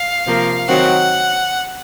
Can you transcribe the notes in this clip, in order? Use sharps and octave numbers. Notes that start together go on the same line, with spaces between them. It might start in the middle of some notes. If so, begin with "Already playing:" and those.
Already playing: F5
C3 F3 A#3
D#3 F#3 C4 F#4 F#5